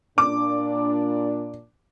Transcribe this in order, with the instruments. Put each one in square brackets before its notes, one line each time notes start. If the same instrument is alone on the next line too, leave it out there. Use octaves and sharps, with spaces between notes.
[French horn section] A#2 D4 [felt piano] D6